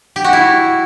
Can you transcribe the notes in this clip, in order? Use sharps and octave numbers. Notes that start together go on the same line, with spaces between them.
G4
F#4
E4